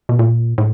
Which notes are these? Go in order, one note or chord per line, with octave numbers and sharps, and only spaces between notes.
B2
A#2
A2